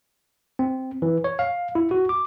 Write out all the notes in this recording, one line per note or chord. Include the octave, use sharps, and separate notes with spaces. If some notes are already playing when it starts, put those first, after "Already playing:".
C4
E3
C#5
F5
E4
F#4
D6